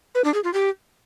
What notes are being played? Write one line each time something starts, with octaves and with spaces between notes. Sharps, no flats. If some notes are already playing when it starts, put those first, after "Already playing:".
B4
D4
G#4
F4
G4